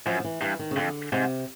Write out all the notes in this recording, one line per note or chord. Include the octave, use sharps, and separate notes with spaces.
F#2 F3
F3
E3
G2 E3
D#3
C#3
F2 D3
G#2 C3